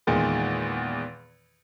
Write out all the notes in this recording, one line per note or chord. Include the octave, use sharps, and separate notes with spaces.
E2 A#2 D#3 G#3